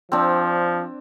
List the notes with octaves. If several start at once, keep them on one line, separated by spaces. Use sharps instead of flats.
F3 C4 D4